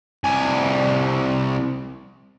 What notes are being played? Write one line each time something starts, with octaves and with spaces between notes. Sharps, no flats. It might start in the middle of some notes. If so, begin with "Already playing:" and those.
C2 G#5